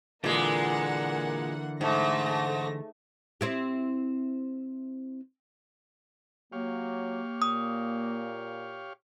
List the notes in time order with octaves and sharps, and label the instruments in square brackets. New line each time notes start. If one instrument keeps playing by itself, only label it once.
[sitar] A#2 G#3 [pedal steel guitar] D3 E3 [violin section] A#3 F#5
[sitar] G#2 [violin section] A3 A#6
[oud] C4 E4 G4
[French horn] F#3 [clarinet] A#3 [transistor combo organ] G4 C#5 F5
[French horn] A#2 [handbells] D#6